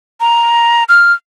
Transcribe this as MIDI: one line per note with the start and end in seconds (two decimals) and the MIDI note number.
0.20 0.84 82
0.89 1.13 89